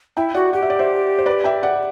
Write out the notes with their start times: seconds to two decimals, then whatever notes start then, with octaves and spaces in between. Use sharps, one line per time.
0.17 E4 E5 G5
0.34 F#4 D5 F#5
0.53 G4 F#5
0.62 E5
0.70 D5
0.79 C5 E5
1.18 C5
1.26 B4 D5
1.44 E5 G5
1.63 D5 F#5